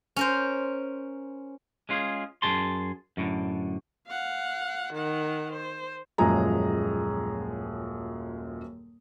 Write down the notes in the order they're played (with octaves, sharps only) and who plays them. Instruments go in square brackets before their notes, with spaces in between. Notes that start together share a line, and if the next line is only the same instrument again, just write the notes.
[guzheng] C#4 A#4 C5
[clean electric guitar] G#3 C#4 F4 F#4 G#4
F#2 C#3 G#4 A5 C6
F#2 A2 D3
[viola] F5 F#5
D#3 F#5
C5
[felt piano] D#1 F#2 F3 G#3 G#4 A#5